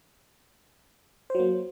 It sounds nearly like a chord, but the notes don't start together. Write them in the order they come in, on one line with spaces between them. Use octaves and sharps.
C5 F#3 A#3